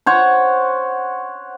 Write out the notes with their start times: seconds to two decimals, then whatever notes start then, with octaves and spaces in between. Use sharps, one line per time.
0.06 C5 C#5 F#5